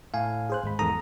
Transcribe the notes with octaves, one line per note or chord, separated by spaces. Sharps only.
A2 F5 G#5
G#4 C5 F#6
G#1 G#3 B5
E2 G#2 D#3 A4 A#5 D#6